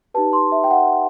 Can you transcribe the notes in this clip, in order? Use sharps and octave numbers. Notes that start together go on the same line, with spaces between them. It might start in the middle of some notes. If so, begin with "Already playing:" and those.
D#4 G4 B4 A5
C6
E5
G5
F#5